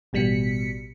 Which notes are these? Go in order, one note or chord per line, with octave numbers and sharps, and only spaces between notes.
A1 B2 G3 B6 C#7